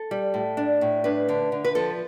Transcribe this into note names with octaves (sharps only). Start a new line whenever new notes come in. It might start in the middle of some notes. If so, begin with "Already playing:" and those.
Already playing: A4
G3
A2
D4
A2
D4 B4
D3
D3
B4
F3 A4